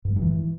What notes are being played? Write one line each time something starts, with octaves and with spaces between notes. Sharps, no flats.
G2
G3
G2
E3